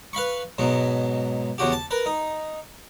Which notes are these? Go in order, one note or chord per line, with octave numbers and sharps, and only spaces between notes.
B4 F5 B5 C#6
G#2 B2 F#3
E2 C#3 F#4 G4
A5
A#4 B4
D#4